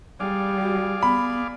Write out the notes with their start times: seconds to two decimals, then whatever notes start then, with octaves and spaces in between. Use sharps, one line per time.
0.20 G3 G#4 D5 F5
0.62 F#4
1.02 B3 B5